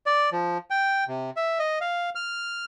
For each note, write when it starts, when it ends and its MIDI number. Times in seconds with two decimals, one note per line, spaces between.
0.06 0.30 74
0.32 0.58 53
0.70 1.04 79
1.08 1.30 48
1.36 1.59 76
1.59 1.79 75
1.81 2.10 77
2.15 2.65 89